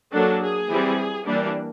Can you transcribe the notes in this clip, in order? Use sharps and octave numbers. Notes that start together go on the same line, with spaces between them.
F#3 A#3 D4 A4
G#4
E3 G3 C4
E3 G3 A#3 D4